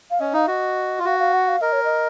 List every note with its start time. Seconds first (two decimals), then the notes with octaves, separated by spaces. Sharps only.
0.11 F5
0.20 C#4 D#5
0.33 D#4 F5
0.48 F#4 D#5
0.99 F4
1.05 F#4 F5
1.19 F5
1.33 F#5
1.48 F5
1.61 A#4 D#5
1.73 C#5
1.84 D#5